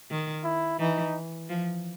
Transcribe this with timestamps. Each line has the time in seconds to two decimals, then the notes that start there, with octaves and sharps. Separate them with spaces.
0.11 D#3
0.44 E4
0.79 E3 D#4
1.49 F3